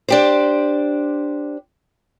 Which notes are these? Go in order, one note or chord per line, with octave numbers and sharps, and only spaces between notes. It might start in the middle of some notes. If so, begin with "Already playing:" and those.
D4 G4 C5